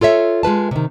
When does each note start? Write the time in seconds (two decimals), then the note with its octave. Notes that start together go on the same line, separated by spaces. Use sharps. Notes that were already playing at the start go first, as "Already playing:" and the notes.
0.01 F4 A4 C#5 E5
0.43 G#3 F4 B4 A5
0.71 C3 D#3